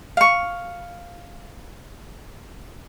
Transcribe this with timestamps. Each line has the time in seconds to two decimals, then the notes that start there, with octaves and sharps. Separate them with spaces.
0.17 F5 C#6